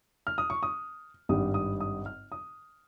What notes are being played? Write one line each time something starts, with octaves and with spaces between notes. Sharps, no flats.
F6
D#6
C#6
D#6
G#1 G2 G3 D#6
D#6
D#6
F6
D#6